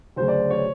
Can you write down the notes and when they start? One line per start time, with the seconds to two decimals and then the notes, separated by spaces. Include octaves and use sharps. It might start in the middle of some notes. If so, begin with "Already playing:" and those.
0.16 D2 C#3 F#3 C5
0.28 D5
0.50 C#5